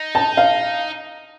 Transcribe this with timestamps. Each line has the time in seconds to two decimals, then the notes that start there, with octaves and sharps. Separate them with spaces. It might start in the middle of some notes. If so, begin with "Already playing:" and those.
Already playing: D#4
0.15 A5
0.37 F5